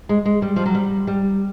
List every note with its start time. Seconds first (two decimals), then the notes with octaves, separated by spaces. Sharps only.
0.09 G#3
0.25 G#3
0.42 G3
0.56 F3
0.66 F#3
0.75 G3
1.07 G3